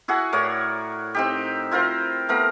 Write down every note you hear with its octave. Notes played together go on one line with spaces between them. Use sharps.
E4 F#4 G#4 F#5
A2 A#4 C#5 D5
C4 D#4 G4
E4 F4 A#4 C5
A3 B3 A#4 F5